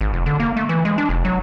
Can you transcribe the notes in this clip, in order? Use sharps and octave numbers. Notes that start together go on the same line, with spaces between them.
G#1
F1
D3
A#3
A3
E3
G#3
D4
F1
F#3